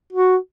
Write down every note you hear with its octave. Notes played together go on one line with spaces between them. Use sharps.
F#4